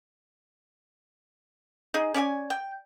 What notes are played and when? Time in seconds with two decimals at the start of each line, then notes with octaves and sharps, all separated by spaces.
1.94 D#4 G#4
2.14 C#4 D5 E5 G#5
2.50 G5